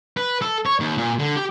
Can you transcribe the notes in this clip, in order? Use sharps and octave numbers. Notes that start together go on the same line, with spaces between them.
B4
A4
C#5
D#2
A#2
D3
G4